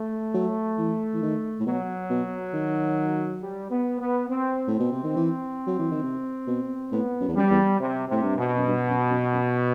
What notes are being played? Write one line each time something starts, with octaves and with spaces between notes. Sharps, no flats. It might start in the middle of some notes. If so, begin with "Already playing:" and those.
Already playing: A3
F#3
E3
E3
D#3
A2
B2 F#3
B2
D#3
G3
B3
B3
C4
A2
C4
B2
C3
D#3
E3
F#3
E3
D#3
C3
B2
A2 B3
F#2
E2
F#2 G3
E2
C3
A2 C3
G2
B2
F#2
G2
F#2
F#2
F#2